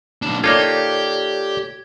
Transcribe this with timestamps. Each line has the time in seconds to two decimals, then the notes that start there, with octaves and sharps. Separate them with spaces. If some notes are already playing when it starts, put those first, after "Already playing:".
0.22 B1 D4
0.44 A#3 D#4 F4 G4 A4 C#5 D5 G#6